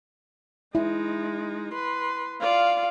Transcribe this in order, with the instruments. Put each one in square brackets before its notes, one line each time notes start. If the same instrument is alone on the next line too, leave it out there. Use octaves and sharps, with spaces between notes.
[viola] G#3 D#4 [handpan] E4
[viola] B4 C6
[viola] F4 D5 [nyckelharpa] F5